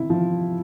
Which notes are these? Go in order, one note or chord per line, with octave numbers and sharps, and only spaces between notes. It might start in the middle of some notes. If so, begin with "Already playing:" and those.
Already playing: C3 E4
F3